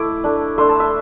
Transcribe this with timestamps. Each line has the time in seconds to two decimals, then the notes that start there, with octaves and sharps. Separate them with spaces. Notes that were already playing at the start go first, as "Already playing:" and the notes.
Already playing: A3 E4 D6
0.24 A3 D4
0.58 A3 D4 C6
0.69 A5
0.80 E5